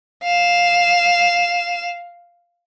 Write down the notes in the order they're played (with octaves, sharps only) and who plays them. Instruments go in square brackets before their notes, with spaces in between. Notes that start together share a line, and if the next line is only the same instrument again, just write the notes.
[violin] F5 E7